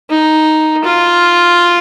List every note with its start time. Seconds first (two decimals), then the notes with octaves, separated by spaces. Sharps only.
0.10 D#4
0.84 F4